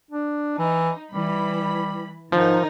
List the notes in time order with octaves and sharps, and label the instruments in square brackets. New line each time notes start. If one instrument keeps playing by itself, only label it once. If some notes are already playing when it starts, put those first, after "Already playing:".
[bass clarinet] D4
[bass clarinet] E3 [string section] D#4
[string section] E3 B5 [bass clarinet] G3
[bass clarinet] G#2 [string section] D#3 D#4 A#4 [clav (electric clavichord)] F3